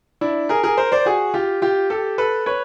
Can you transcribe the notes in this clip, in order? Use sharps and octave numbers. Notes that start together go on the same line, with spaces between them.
D4 E4
G#4 A#4
G#4 A#4
A#4 C5
C5 D5
F#4 G#4
F4 G4
F4 G4
G4 A4
A4 B4
B4 C#5